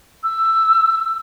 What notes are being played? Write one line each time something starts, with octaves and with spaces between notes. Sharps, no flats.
E6